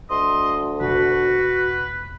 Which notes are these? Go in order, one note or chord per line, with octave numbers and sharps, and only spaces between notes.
D2 D#5 C6
E1 F#4 B4